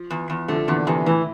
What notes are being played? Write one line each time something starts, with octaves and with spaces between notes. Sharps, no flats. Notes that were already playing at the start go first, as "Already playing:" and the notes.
Already playing: F3
E2
E2
D3 F3 A3
E2 A#2 D3
E2 C3 E3
A2 E3